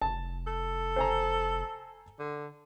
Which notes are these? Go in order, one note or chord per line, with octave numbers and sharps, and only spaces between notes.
F1 A5
A4
C5 G#5 A#5
D3